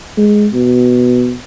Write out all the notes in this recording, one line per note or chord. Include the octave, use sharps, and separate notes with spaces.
G#3
B2